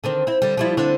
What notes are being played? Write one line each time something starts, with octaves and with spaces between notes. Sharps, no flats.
D3 D#3 C4
C4 E4
D3 G3
F3 G3 E4
D3 C4 D4